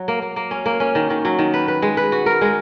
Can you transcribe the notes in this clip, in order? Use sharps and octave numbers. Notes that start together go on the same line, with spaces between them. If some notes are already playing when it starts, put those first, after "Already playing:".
Already playing: F#3
A#3
A#3
A#3
C#4
A#3
C#4
D#3
D#3
F#3
D#3
B4
B4
G#3
B4
F#4
A#4
G#3